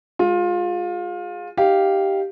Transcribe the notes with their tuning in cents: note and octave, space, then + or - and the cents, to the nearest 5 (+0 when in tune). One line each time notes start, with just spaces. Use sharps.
G#3 -10 F4 +25
D#4 +0 G4 -5 F5 -5